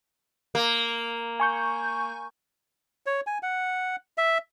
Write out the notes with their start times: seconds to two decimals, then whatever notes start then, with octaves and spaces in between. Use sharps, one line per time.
0.55 A#3
1.40 G#5 C#6 G6
3.06 C#5
3.27 G#5
3.43 F#5
4.18 E5